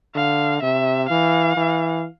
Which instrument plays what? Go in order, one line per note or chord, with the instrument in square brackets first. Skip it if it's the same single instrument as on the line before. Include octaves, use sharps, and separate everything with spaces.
[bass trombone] D3 [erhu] F5
[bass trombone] C3 [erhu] E5
[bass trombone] E3 [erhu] F5
[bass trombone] E3